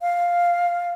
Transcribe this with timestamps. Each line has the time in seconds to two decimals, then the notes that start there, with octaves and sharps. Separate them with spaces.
0.02 F5